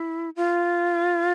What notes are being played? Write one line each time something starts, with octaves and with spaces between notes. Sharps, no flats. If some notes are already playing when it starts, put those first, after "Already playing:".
Already playing: E4
F4